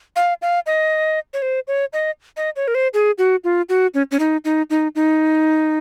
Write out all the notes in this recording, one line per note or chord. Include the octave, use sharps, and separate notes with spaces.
F5
F5
D#5
C#5
C5
C#5
D#5
D#5
C#5
A#4
C5
G#4
F#4
F4
F#4
C#4
C#4
D#4
D#4
D#4
D#4